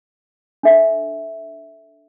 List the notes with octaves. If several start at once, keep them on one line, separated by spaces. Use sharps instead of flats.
D4 A4 E5